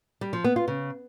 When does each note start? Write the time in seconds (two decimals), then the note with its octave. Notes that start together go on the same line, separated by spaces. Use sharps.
0.21 G3
0.33 F3
0.44 B3
0.56 F4
0.68 C#3